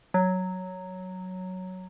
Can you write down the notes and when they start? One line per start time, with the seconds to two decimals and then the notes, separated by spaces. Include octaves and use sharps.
0.14 F#3